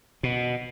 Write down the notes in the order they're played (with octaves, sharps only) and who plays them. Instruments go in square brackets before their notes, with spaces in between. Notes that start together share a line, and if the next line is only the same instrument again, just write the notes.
[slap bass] B2